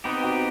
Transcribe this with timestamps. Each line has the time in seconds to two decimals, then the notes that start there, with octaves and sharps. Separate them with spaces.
0.04 B3 C4 D#4 G4
0.23 F#4